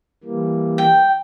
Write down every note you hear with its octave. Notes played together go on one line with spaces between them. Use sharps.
E3 G3 A#3
G5